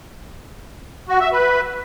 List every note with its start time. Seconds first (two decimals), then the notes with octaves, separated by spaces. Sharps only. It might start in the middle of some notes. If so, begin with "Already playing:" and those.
1.09 F#4
1.21 E5
1.32 B4